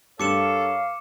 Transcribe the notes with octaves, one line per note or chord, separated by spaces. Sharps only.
G2 A4 A#4 C#5 F5 D6 C#7 E7